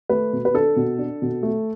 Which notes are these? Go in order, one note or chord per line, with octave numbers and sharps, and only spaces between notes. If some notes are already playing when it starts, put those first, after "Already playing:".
A3 B4
B2
B4
D4 A4
B2
D4
B2
A3